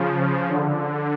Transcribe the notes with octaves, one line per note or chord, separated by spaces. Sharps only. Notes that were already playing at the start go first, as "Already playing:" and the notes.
Already playing: C#3 F3
F3
D3